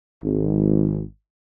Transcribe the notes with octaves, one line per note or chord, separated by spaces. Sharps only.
G#1